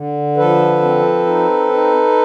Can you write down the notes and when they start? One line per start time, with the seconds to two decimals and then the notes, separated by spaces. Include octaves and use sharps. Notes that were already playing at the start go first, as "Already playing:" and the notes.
Already playing: D3
0.37 F3 A4 B4
0.82 C4
1.27 D#4
1.73 D#4